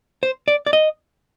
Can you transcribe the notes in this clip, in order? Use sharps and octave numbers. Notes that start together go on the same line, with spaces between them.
C5
D5
D5
D#5